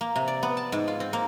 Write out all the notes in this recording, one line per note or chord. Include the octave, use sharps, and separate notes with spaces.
A#3
C3
D5
B3
A5
G#2
F4
C4
A#3